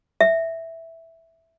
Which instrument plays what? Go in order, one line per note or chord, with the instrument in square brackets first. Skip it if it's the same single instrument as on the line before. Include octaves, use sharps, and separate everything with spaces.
[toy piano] E5